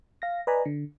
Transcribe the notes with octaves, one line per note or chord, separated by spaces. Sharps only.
F5 A#6
B4 D5 D#5 G#5 A#5 B5
D3